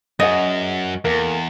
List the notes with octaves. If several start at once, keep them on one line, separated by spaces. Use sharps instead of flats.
F#2 G#4 D#5 F#5
E2 A#3 A4 A#4